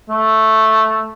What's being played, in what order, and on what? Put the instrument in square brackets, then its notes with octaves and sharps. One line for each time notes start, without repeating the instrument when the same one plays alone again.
[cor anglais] A3